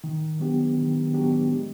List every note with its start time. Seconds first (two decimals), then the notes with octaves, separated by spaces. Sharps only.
0.04 D#3
0.40 F#3 B3 D4 G4
0.77 D#3
1.13 F#3 B3 D4 G4
1.51 G#3